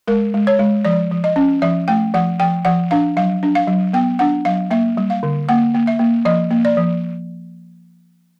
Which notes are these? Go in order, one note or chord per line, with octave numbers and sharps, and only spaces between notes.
G#3 A#4
G#3
C#5
G#3
F3 D5
F3
D#5
C#4
F3 E5
A3 G5
F3 F#5
F3 G5
F3 F#5
D4 F5
F#3 F5
D4
F5
F#3
B3 G5
D4 F#5
F#3 F5
A#3 E5
G3
F5
D3
A#3 F#5
A#3
E5
A#3
F3 D#5
A#3
D5
F3